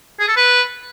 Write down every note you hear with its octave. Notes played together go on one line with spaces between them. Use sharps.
G#4
A4
B4